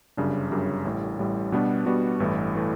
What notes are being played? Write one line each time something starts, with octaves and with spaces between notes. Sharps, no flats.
G1 F#2 C#3 G3 D4
G1 F#2 C#3 G3 D4
A1 A2 G3
A1 A2 G3
B2 G3 B3 D4 F#4
B2 G3 B3 D4 F#4
A1 G2 E3 A3
E3 A3